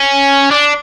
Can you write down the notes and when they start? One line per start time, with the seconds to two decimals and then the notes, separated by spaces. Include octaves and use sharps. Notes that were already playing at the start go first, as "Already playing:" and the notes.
Already playing: C#4
0.50 D4